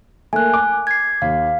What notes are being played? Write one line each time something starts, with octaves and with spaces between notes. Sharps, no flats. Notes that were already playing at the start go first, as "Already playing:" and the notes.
A3 A#3 G#5 F#6
D6
G#6 C7
D#2 F5